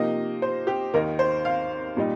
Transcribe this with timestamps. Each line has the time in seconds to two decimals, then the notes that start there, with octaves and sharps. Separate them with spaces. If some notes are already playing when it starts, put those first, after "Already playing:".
Already playing: C3 F3 A#3 D#4 D#5
0.42 C5
0.67 G4
0.94 D#2 D#3 A#3 D#4 A#4
1.19 C5
1.45 F5
1.97 A#2 G3 D#4